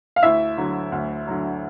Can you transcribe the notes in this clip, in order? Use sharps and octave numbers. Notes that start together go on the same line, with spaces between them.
F5
D2 E4 E5
D3 F#3
D2
D3 F#3